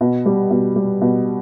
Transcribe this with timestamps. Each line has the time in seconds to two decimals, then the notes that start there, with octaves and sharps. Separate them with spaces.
0.01 B2
0.26 G3
0.51 B2
0.76 G3
1.01 B2